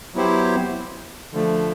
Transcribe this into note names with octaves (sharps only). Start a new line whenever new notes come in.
F#3 B3 E4 G4 C5
D3 F3 A3